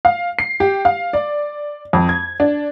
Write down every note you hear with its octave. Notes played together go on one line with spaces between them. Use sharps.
F5
C7
G4
F5
D5
F2
G#6
D4